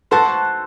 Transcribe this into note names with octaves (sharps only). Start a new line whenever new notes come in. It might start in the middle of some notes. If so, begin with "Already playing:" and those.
F#4 A4 C5 F#5 A5